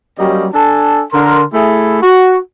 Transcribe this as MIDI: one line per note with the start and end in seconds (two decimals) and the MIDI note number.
0.18 0.47 54
0.18 0.47 55
0.18 0.47 58
0.18 0.47 61
0.18 0.47 67
0.18 0.47 75
0.54 1.02 62
0.54 1.02 69
0.54 1.02 80
0.54 1.02 81
1.13 1.43 50
1.13 1.43 70
1.13 1.43 84
1.54 2.00 57
1.54 2.00 64
1.54 2.00 68
2.02 2.37 66